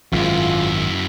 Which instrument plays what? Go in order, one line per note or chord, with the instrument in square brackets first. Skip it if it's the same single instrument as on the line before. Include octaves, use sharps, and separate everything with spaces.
[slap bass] G#1 [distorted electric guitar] F#2 E4 [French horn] F4